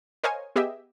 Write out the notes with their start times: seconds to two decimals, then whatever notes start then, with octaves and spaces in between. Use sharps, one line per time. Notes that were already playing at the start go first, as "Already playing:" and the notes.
0.24 A#4 C5 C#5 D#5 F5 G#5
0.56 B3 G4 G#4 D#5 E5